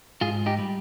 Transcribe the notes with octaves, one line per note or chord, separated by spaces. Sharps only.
G#2 F4 G#4
D#4 G4
G3